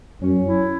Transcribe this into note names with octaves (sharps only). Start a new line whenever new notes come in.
F#2 C#4
E4